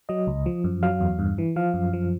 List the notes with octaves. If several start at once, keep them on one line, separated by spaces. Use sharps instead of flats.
F#3 D#5
C#2
F3
F#2
F#3 F5
E2
G2
E3
F3 F5
F#2
F3